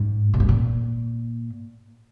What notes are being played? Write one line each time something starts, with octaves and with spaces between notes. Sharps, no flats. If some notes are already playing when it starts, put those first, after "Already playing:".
Already playing: G#2
A#2
G#2
A#2